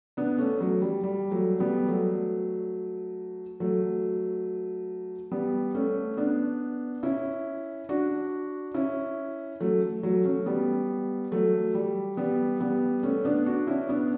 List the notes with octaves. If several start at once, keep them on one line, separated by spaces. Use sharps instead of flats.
B3 D4
A3 C#4
F#3 A3
G3
G3
F#3 A3
G3 B3
F#3 A3
F#3 A3
G3 B3
A3 C#4
B3 D4
C#4 E4
D4 F#4
C#4 E4
F#3 A3
F#3 A3
A3 C#4
G3 B3
F#3 A3
G3
G3 B3
G3 B3
A3 C#4
B3 D4
D4 F#4
C#4 E4
B3 D4